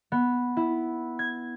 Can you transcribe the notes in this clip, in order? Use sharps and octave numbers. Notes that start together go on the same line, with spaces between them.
B3
E4
G#6